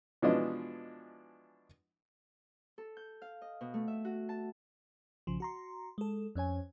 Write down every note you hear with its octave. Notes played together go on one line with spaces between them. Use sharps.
B2 E3 F3 G#3 D4 D#5
A4
G6
F5
D#5
B2
A3
E5
F#4
A5
B1 C#3 F3
F#4 A#5 C6
G#3 A4
F2 C#4 C#5 G#5